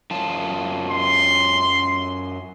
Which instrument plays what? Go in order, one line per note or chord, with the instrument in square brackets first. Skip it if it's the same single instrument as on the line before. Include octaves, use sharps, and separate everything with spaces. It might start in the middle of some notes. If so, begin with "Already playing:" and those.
[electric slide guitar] F#2 F4 A5
[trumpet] C6